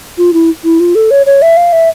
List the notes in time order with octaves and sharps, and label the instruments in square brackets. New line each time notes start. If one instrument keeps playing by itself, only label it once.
[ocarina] F4
E4
E4
F4
A4
C#5
C#5
E5
F5
E5